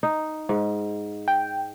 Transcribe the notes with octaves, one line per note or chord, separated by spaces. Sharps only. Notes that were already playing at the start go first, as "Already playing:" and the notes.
D#4
G#2
G5